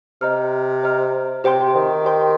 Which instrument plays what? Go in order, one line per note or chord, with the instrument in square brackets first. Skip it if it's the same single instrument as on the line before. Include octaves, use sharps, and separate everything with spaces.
[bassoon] C3 [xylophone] C5 D#5 A#5 F6
[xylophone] C5 D#5 A#5 F6
[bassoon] C3 [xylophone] G4 C5 G5 C6
[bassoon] D#3
[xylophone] G4 C5 G5 C6